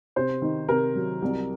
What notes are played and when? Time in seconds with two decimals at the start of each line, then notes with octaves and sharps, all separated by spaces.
0.16 C3 C5
0.42 D#3
0.68 C3 A#4
0.95 F#3
1.22 C2